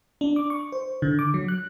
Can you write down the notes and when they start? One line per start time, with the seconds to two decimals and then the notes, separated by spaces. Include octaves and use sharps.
0.21 D4
0.36 D6
0.50 C#6
0.72 C5
1.02 D3
1.19 D6
1.34 F#3
1.48 F#6